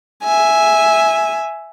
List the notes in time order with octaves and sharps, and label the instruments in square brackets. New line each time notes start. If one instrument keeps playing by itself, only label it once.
[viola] E5 G#5